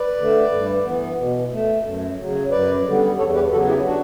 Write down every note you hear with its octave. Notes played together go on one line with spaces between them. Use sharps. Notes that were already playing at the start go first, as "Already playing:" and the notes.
Already playing: B4 D5
D3 A3
G2
E3 B3
B2
A3
F#2
C#3 F#3
F#2 B4 D5
D3 G3 B3
E2 A4 C#5
G4 B4
C#3 F#3 B3 F#4 A4
E4 G4
D4 F#4